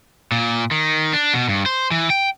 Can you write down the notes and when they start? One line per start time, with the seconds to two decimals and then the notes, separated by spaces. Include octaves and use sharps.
0.32 A#2
0.71 D#3
1.13 D4
1.34 B2
1.48 G2
1.66 C5
1.91 E3
2.10 G5